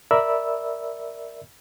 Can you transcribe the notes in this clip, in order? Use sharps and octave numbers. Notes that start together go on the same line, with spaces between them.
A#4 D5 E5 B5 E6